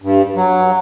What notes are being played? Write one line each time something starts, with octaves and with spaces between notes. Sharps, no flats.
G2
F#3